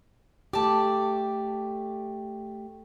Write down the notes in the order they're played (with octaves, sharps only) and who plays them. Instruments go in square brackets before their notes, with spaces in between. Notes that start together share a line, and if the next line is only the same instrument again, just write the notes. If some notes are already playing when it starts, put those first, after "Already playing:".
[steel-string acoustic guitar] A3 G4 [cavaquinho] D5 A5